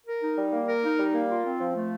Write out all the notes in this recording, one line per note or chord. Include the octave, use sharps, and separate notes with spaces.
A#4
D#4
G3
A#3
A#4
D#4
G3
A#3
F4
C4
F3
A3